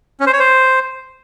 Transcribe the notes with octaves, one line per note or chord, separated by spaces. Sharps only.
C#4
C5
C#5
C5